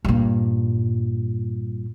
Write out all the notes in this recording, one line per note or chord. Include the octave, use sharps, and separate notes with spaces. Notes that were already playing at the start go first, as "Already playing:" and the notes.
G2 A#2